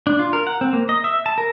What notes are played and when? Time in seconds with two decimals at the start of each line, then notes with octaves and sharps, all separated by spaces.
0.07 D4
0.19 F4
0.33 A#4
0.47 F#5
0.61 C4
0.73 A#3
0.89 D#5
1.04 E5
1.26 A5
1.38 A#4